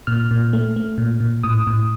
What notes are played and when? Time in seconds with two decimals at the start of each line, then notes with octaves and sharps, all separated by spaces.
0.07 A#2 F6
0.31 A#2
0.53 A3
0.76 A3
0.98 A#2
1.20 A#2
1.43 A2 D#6
1.67 A2